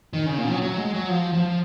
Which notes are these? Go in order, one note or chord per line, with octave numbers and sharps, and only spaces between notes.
D#3
C#3
A#2
F#3
F#3
G#3
F#3
F3
F3